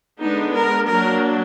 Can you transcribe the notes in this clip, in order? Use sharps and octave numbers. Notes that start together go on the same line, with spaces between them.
D3 G#3 B3 D4 D#4
A#4
F#3 A#3 D4 A#4